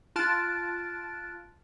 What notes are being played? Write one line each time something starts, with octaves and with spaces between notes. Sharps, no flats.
F4 A5 F6 F#6 A6 D7